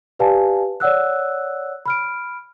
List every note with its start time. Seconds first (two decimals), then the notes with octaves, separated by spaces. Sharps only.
0.19 G4 B4 D5 F5 G#5 A5
0.80 C#5 D5 F#5 E6 F#6
1.86 B5 F6 D7